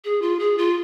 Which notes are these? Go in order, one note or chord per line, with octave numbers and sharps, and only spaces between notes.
G#4
F4
G#4
F4